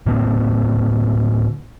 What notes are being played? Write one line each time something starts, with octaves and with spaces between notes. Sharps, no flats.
A2 D3 A#3 C4